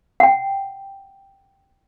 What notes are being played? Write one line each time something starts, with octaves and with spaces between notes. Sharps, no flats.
F#5 G5